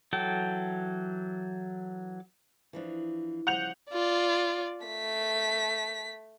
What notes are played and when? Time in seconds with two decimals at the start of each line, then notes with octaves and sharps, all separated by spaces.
0.13 E3 F#3 A4 G5
2.73 E3 F3 D4
3.47 C#3 F3 G3 F#5 G6 F7
3.91 F4 D5
4.85 A3 B6